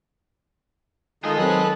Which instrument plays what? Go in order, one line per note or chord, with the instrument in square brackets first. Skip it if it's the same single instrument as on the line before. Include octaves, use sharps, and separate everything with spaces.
[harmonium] D#3 [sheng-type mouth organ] D#4 F4 A4 [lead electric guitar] G#4 D#5
[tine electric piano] F#3 C4 [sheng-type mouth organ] A4 B4 F#6